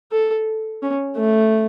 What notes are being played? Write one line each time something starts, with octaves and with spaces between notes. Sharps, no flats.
A4
C#4
A3